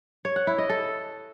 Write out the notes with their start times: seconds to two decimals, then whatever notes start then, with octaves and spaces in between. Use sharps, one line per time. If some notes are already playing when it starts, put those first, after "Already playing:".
0.25 C#5
0.36 F#5
0.47 E4
0.58 D#5
0.70 A4